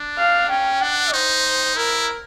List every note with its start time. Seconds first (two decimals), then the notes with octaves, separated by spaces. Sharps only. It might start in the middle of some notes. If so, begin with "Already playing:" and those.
Already playing: D4
0.18 F5
0.50 C#4 G5
0.81 D4 F#5
1.13 D#4 C5
1.77 E4 A#4